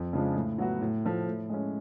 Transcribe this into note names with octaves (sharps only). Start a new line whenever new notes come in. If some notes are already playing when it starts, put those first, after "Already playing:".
Already playing: F2
C#3 F3 G#3 D4
A2
F#3 B3 F#4
A2
F3 A3
A2
G#3 C#4